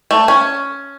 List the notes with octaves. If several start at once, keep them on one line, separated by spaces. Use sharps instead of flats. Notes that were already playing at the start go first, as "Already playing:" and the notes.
A3
C#4